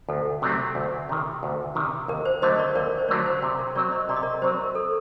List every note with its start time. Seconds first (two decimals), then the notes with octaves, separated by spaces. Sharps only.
0.09 D2 A4
0.42 C3 F#3 A3 C4
0.75 D2
1.09 C3 D#3
1.43 D2
1.75 C3 D#3
2.08 D#2 A#4
2.25 C5
2.42 D3 F#3 A3 C5 D#5
2.59 A#4 D5
2.75 D#2 A#4 D5
2.98 C5
3.08 D3 F#3 A3 A#4 D5
3.26 C5
3.42 C3
3.59 A#4
3.75 F#3 C4 A#4 D5
3.92 C5 D#5
4.09 C3 D5
4.16 D#5
4.23 A#4 D5
4.42 F#3 C4 C5
4.64 A#4
4.75 A4